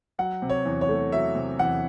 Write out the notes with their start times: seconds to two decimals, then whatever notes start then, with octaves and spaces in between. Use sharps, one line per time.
0.19 F#3 F#5
0.42 C3
0.50 C#5
0.66 E2
0.81 C#5
0.89 A3
1.12 F#3 E5
1.35 C3
1.59 E2 F#5